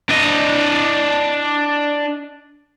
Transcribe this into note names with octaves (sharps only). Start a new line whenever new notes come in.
D4 D#5